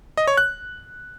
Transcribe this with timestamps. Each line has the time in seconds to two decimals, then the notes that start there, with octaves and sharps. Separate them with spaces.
0.17 D#5
0.27 C#5
0.37 F#6